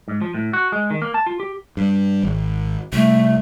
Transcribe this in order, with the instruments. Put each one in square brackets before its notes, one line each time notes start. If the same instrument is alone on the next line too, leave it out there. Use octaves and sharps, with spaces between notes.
[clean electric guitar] G#2
F3
A2
F#4
G#3
D#3
A#3
A5
F4
G4
[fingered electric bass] G2
G#1
[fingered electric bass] C2 [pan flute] A3